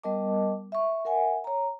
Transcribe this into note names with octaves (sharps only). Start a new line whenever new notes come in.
G3 B3 A#4 D#5 A5 D6
E5 C#6
A#4 E5 F#5 G#5
C#5 A#5